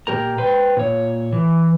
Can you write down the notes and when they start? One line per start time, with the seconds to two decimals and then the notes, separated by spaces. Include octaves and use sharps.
0.07 A#2 F3 G4 A#4 A#5
0.38 B4 C5 G5
0.77 A#2 C#5
1.32 E3